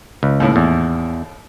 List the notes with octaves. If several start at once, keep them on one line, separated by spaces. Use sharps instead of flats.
C#2
D#2 A2
E2